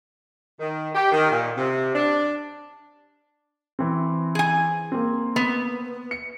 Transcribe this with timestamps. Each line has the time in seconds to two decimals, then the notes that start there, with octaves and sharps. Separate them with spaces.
0.60 D#3
0.94 G4
1.11 D#3
1.31 A#2
1.57 C3
1.94 D4
3.79 E3 C4
4.35 G#4 G#5
4.92 A#3 C4
5.36 B3
6.11 C#7